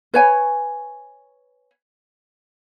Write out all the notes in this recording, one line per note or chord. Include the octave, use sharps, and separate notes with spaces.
B4 C#5 G#5